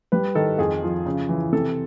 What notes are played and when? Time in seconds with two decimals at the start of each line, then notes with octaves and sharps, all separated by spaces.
0.12 G3 B4
0.35 D#3 A4
0.58 F2 G#4
0.83 F3
1.06 C#3
1.29 E3
1.52 C3 A4